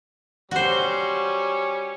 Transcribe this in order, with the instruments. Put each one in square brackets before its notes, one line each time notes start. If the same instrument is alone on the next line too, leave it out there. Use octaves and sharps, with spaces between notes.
[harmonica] G3 C#4 [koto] F#4 C5